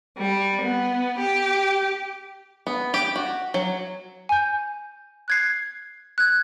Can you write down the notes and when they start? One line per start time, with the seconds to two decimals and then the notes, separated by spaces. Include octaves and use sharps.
0.17 G3
0.61 B3
1.18 G4
2.67 B3
2.94 G4
3.16 F#4
3.54 F#3
4.29 G#5 G6
5.28 F#6 G#6 C7
6.18 F#6 G#6